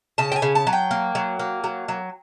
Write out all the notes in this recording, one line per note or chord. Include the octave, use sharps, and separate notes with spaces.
C#3 A5
G5
G#5
C#3
A5
F#3
G5
A#3
F#3
A#3
F#3
F#3